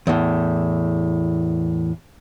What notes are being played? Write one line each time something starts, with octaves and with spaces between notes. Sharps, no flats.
E2 A2